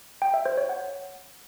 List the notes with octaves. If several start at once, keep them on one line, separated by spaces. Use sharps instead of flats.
G5
E5
C5
C#5
F#5